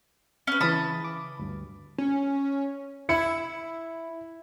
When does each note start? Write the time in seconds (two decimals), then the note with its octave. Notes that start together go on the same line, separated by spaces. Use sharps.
0.47 C#4 B4
0.61 C#3 E3 A5 B5 D#6
1.04 D6
1.39 D2 G2
1.98 C#4
3.09 E4 E5 C#7